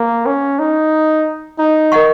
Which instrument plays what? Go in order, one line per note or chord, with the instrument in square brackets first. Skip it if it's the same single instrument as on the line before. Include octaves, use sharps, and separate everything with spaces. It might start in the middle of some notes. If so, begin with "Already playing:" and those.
Already playing: [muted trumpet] A#3
C#4
D#4
D#4
[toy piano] A#4 D#5 F#5 C#6